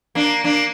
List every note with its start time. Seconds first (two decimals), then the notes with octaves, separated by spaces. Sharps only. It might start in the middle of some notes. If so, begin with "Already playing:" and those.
0.15 A#3 D4
0.44 A#3 D4